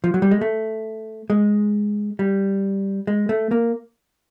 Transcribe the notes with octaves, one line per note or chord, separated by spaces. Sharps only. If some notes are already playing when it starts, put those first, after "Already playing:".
F3
F#3
G3
G#3
A3
G#3
G3
G#3
A3
A#3